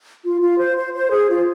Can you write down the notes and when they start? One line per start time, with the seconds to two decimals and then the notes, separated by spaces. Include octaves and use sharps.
0.24 F4
0.41 F4
0.59 C5
0.77 C5
0.93 C5
1.11 G#4
1.29 F4